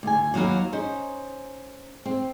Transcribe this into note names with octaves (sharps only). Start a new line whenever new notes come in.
D2 G#5
D#2 F#3 A#3 A#4 B4
C#4 D#4 C5
C4